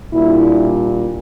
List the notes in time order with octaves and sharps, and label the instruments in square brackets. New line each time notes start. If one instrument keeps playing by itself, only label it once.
[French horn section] A#2 G3 D4 E4